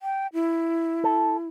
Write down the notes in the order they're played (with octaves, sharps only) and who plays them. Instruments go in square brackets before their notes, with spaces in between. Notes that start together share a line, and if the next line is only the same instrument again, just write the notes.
[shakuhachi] G5
E4
[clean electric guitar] A4